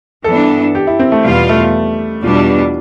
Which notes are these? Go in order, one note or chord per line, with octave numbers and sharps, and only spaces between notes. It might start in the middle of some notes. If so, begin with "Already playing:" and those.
G2 E3 B3 D4 A4
G4
E4
C4
A3
E2 B2 G3 B3 F4
A3
E2 B2 G3 D4 F4